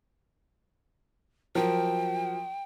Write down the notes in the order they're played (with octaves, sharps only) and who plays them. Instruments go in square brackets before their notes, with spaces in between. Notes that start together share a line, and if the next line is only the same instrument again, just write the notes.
[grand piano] F3 F#3 A#4 [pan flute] G5